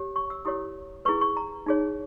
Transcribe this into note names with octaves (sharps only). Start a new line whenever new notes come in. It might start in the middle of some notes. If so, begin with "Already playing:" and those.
Already playing: G4 C#5
C#6
E6
E4 G4 A#4 C#5 D#6
E4 G#4 B4 C#6
C#6
A#5
D#4 G#4 C#5